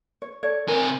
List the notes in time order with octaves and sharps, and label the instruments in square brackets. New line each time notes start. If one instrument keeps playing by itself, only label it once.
[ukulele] C#5
A4 C#5 D5
[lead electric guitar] C3 G#5 [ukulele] A#4